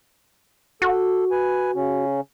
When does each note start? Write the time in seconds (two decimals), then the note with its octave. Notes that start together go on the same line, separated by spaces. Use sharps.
0.82 F#4 A4
1.31 B4 G#5
1.75 C#3 C#4